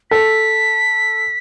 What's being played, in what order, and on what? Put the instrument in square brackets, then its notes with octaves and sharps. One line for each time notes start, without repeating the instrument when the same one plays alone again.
[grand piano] A4 [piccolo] B6